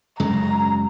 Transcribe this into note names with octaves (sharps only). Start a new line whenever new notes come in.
F#2 C#3 G#3 A#5